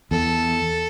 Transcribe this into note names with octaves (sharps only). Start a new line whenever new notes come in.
E2 A4